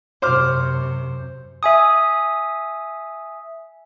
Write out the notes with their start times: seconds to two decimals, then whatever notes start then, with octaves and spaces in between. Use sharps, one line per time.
0.22 F#2 C3 C5 D6 F6
1.63 E5 G#5 D#6